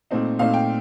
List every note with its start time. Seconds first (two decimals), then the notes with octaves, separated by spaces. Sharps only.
0.11 A#2 A3 C4 D#4
0.39 A#2 A3 C4 D#4 F5
0.53 G5